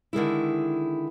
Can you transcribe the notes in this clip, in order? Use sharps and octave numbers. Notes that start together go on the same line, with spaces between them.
D3 D#3 G#3 E4